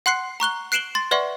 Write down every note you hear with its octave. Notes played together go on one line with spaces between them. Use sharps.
F#5 C6 F#6 C7 C#7
A#5 C#6 F#6 G7
F#6 C7 D7 E7 F#7 G7
C6 A6
B4 D5 E5 F#5 C6 C#6